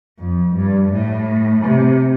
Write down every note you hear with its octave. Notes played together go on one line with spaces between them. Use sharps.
F2
G2
A2
C3